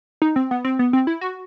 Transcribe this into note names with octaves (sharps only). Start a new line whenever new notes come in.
D#4
C4
B3
C4
B3
C4
E4
F#4